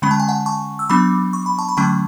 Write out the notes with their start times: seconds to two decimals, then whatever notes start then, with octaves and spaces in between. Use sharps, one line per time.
0.02 D3 G#3 C#4 B5
0.11 A5
0.20 G#5
0.28 F#5 A5
0.46 A5 C#6
0.79 E6
0.89 F#3 B3 D4 B5 D6
1.33 C#6
1.46 B5
1.58 A5 C#6
1.69 B5
1.77 D3 F#3 A3 C#4 A5 C#6